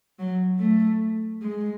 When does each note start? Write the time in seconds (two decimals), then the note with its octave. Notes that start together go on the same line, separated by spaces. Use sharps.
0.19 F#3
0.59 A3
1.42 G#3